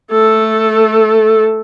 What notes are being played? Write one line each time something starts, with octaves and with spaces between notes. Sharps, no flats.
A3 A4